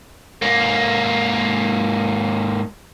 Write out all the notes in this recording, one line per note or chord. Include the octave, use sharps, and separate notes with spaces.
G#2 A#3